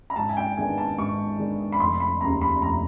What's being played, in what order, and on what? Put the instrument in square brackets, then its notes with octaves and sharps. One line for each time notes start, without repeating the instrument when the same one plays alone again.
[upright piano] A#5
G#2 A5
G#5
G5
D#3 G#3 B3 D4 G#5
A5
G#2 C#6
D#3 G#3 B3 D4
B5
F1 C6
B5
D#2 C#3 A#5
B5
F1 A#5